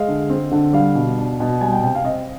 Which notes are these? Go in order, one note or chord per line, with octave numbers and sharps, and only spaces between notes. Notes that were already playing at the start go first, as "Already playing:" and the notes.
Already playing: G#3 F5
D3
C4
D3
G3 F5
B2
D4
B2
G3 G#5
G5
C3 G5
F5
C4 D#5